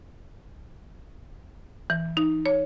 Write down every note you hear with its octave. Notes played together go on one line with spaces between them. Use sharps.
E3
D#4
C#5